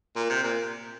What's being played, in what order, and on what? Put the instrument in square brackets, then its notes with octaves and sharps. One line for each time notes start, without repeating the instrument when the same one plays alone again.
[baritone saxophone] A#2
C3
A#2